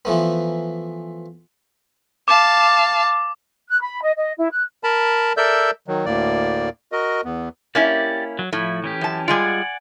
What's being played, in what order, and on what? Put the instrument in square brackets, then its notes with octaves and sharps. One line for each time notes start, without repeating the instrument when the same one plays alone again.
[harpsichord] E3 F3 A3 B3
[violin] F5 A5 [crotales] D6
[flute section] F#6
B5
D#5
D#5
E4
F#6
[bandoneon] A#4 A5 B5
A4 A#4 D5 E5 E6 G6
D#3 F#3
D2 A2 A#3 D5
F#4 A#4 D#5
E2 B3
[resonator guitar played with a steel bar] A#3 C#4 E4 [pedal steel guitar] G4 D5
[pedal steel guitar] F#3
[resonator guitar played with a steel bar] A2 [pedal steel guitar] F3 E4
[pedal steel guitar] E3 C#4 G4
[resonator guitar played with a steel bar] F#2 A5
[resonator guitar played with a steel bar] G3 G#3 F4 [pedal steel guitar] D5 F#5 G#5